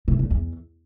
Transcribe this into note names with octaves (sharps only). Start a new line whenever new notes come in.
C3
A#2
E2